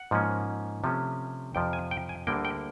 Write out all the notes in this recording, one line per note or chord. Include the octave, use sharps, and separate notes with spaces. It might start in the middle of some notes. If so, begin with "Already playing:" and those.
Already playing: F#5
G#2 F3 A#3 C#4
C3 F3 A3 C#4
F2 C3 F3 G5
G#5
G5
G#5
D2 D3 G3 A#3 G5
G5